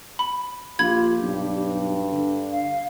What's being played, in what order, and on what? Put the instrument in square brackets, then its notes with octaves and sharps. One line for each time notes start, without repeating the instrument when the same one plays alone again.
[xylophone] B5
[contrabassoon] A#1 [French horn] F4 [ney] G4 [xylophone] B5 G#6
[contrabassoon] B1 [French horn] G2
[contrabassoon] D3
[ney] F5